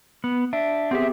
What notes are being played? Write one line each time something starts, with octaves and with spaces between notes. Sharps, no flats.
B3
D4 E5
B3 C4 G4 G#4 E5